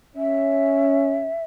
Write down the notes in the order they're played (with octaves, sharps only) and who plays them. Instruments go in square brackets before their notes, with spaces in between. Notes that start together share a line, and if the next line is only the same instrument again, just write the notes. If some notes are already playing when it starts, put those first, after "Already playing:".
[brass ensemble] C#4 [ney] E5